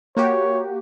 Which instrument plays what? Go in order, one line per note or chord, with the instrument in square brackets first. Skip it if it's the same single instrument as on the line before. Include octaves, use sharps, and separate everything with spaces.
[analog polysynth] A#3 F#4 G4 [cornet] C#5